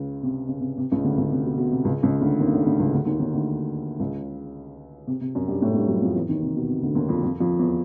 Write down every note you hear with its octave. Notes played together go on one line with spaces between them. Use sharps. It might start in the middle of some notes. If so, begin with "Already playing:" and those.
Already playing: C#2 C#3
C3
C#3
C3
C3
C#2 C#3
D2 D3
C#2 C#3
C3
B2
B2
C3
C#2 C#3
C#2 C#3
D2 D3
D#2 D#3
C#3
D2 D3
D2 D3
C#2 C#3
D2 D3
D#2 D#3
D#2 D#3
D2 D3
C#2 C#3
C3
C3
F#2 F#3
G2 G3
A2 A3
G2 G3
F#2 F#3
F2 F3
E2 E3
D#2 D#3
C3
B2
C3
D2 D3
D#2 D#3
F2 F3
F2 F3
F2 F3
E2 E3